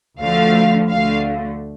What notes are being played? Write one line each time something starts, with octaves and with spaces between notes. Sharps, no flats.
D2 D3 F3 A3 F5
D2 D3 A3 F5